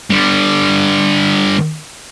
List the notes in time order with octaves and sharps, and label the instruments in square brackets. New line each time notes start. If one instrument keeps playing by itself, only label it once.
[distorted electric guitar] D3 G3